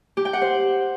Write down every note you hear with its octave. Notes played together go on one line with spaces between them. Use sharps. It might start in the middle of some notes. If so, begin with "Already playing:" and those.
G4
G5
F#5
C5